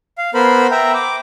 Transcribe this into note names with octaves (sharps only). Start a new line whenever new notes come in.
F5
B3 A#4 C5 B5
E5 G5 A#5
D6